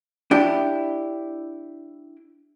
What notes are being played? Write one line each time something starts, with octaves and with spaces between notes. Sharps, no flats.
D4 E4 G4